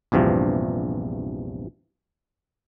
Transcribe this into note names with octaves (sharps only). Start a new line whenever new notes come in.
A#1 E2 G2 C3 F3